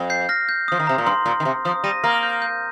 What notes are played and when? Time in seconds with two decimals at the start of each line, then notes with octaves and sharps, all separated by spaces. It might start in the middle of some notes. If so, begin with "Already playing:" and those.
Already playing: F2
0.10 G6 C7
0.29 F6 A#6
0.49 G6
0.68 F3 D#6
0.80 D#3
0.87 C3 A#5
0.98 A#2
1.06 G2 C6
1.26 A#2
1.40 D#3
1.45 C3
1.65 F3 D#6
1.84 G3 A#6 D#7
2.04 A#3 F6 A#6
2.23 G6
2.42 G6